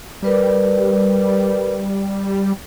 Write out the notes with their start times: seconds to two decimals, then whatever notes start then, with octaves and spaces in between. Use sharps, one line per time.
0.22 G3 A#4 B4 D5